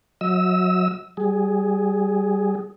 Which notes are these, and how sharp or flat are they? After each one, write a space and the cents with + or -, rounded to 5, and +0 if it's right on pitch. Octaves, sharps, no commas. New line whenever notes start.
F#3 -20 D#5 +40 E6 -10
G3 -20 G#4 +0